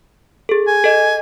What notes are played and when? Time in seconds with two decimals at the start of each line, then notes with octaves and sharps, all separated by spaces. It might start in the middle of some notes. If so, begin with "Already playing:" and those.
0.49 G#4 A4
0.67 G#5
0.84 A4 D#5